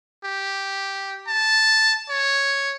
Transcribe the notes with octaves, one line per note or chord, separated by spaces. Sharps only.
G4
A5
C#5